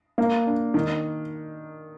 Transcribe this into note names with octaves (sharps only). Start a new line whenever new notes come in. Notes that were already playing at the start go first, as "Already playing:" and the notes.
A#3
D4
D#3